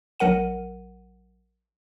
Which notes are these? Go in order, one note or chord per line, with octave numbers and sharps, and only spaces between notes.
A#1 F#3 A#4 F#5 D#7